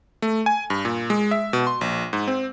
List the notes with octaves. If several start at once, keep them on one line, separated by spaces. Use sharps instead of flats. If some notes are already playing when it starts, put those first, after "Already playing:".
A3
G#5
G2
A#2
G#3
E5
B2
C6
A#1
G#2
C4